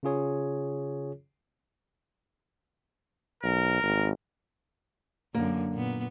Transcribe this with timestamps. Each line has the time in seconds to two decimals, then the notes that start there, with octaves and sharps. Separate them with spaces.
0.03 C#3 C#4 F4 G#4 C#5
3.43 B1 A#4
3.83 G#1
5.35 F#2 D3 A#3
5.73 A#2 B3